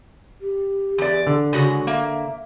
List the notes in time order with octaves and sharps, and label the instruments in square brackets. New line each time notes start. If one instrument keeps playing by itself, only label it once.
[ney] G4
[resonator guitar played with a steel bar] E2 D5
[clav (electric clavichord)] D3
[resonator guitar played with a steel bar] C#3 G#3 F#4 [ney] G#5
[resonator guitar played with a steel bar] A#3 [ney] E5